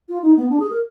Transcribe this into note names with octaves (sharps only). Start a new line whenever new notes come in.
F4
D#4
B3
D4
G#4
A#4